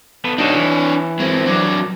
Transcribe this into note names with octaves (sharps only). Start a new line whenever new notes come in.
B3 A4 B4
D4 D#4 F#4 A4 C#5
E3
G#3 C4
F#3 D4